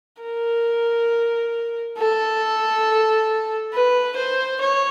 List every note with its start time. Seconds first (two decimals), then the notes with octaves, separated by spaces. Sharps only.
0.22 A#4
1.98 A4
3.73 B4
4.17 C5
4.61 C#5